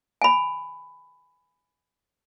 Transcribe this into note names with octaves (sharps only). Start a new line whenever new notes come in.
G#5 B5